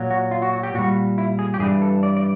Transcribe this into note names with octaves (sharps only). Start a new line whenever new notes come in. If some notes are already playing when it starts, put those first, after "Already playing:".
Already playing: A#2 F#3
F#4
F4
F#4
F#4
G4
A#2 G3 F#4
E4
G#4
G4
G2 E3 G3 G#4
A4
D5
D5